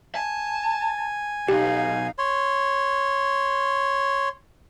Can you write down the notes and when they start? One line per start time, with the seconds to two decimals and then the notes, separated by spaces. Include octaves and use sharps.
0.15 G#5 A5
1.48 B1 D#4 G4 F5
2.18 C#5 C6